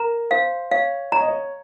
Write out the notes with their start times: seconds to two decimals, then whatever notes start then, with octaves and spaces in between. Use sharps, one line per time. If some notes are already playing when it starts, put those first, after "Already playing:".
Already playing: A#4 A#5
0.31 C5 F5
0.71 C#5 F5
1.12 C#5 A#5
1.21 D#5
1.28 C#5